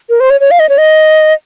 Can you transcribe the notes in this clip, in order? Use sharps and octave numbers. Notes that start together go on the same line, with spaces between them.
A#4
C5
C#5
C#5
F5
D#5
C#5
D#5